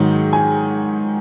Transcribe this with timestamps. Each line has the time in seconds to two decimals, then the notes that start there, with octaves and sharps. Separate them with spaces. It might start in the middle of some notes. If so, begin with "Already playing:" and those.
Already playing: G#2 D#3 F#3
0.33 G#5